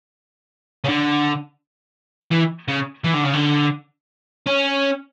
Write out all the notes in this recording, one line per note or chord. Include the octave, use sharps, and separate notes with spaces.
C#3
D3
E3
C#3
E3
D3
C#3
D3
C#4